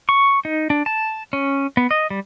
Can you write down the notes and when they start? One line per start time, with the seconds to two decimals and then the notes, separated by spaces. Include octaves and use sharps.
0.09 C#6
0.45 D#4
0.70 D4
0.86 A5
1.33 C#4
1.77 B3
1.91 D#5
2.10 G3